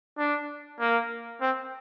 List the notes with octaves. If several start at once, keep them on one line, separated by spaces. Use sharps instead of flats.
D4
A#3
C4